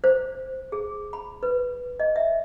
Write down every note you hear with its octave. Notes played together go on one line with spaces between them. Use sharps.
C5
G#4
B5
B4
D#5
E5